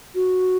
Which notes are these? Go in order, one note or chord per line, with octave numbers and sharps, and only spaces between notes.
F#4